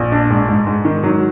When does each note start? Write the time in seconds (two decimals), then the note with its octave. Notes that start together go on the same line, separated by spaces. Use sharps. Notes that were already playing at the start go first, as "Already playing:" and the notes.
Already playing: A#1
0.12 D4
0.30 G#2
0.48 G#2
0.67 G#2
0.85 D#3
1.04 F#3